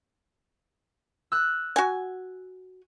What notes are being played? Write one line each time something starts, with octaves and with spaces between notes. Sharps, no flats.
E6 F#6
F#4 G#5